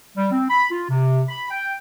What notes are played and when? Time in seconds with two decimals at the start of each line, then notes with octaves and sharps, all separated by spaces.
0.17 G3
0.32 C4
0.50 B5
0.71 F4
0.90 C3
1.29 B5
1.51 G5